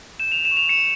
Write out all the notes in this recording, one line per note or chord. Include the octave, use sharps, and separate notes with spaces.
G6 E7
F7
E7
C#6
F7
C#7 E7